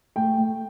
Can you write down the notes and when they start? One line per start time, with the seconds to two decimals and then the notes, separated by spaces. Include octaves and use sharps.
0.16 A3 G5
0.38 A3